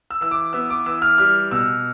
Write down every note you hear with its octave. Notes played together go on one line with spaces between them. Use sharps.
E6
E3 E6
D6
B3 E6
D6
E3 E6
F6
G3 F6
B2 E6